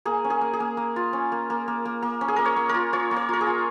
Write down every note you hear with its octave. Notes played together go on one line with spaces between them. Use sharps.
A#3 G#4
C#4
G#4
A#3
G#4
A#3
A#3
F4
C#4
A#3
A#3
A#3
A#3
A#3
C#4
G#4
A#3 A#4
C#5
A#3
A#4
F4
F4 C#5
A#3
C#5
F4 A#4
G#4
F4